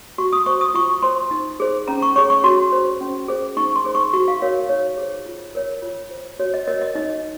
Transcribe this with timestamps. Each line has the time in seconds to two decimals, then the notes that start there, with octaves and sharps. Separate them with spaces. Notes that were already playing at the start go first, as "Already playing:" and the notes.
0.18 F#4 C#6
0.33 D#6
0.46 C5 C#6
0.61 D#6
0.74 F4 C#6
1.02 C5 C6
1.31 D#4
1.60 G#4 C5
1.88 C#4 A#5
2.02 C#6
2.16 G#4 C#5 C#6
2.30 C#6
2.44 F#4 C6
2.72 C5
3.01 C#4
3.28 G#4 C5
3.57 D#4 C#6
3.76 C6
3.85 G#4 C5
3.95 C#6
4.13 F#4 C#6
4.28 F5
4.42 A#4 C#5 F5
4.69 D#4 C#5
4.98 G#4 C5
5.26 F4
5.55 A#4 C#5
5.82 F4
6.11 C5
6.39 F#4 C#5
6.54 D#5
6.67 A#4 C#5 D#5
6.82 D#5
6.95 D#4 D#5